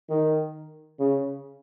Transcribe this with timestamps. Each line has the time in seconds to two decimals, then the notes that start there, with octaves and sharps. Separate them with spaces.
0.10 D#3
1.00 C#3